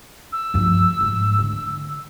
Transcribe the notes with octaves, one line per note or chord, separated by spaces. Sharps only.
E6
G2 F3
G#2
D3